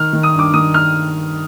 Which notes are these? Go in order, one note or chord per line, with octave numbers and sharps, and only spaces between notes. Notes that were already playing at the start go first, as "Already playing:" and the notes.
Already playing: D#3 F6
D#3
D#6
G2
D6
D#3 D#6
F6